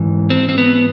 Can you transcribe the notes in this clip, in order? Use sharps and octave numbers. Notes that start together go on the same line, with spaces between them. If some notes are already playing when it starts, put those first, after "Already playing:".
Already playing: G#2 E3
C4
C4
B3